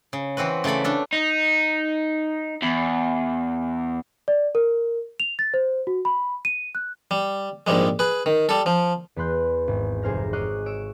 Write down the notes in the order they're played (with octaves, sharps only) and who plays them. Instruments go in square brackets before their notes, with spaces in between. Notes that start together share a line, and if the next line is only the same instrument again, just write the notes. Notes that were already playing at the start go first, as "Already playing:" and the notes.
[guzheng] C#3
E3 C4 F#4 B4
C#3 A3 A4 D5 B5
A3 D4 A4
[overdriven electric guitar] D#4
E2
[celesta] D5
A#4
F7
A6
C5
F#4
B5
D#7
F#6
[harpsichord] G3
A#1 G#2 G3 G#3
G#4 B4
D#3
G3 A4
F3
[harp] E2 B3 B5 C6 F#6 G6
G#1
F1 G#4 C5 A#5 F6 A#6
C#5 D#5 D6 F6 F#6 C7
C#5 E6 D7 E7